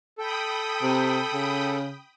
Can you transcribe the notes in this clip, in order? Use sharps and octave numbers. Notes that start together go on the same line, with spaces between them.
A4 G5 B5 D#6
C3
C#3